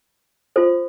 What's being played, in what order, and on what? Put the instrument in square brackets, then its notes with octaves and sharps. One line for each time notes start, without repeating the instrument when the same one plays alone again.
[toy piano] F4 A4 C5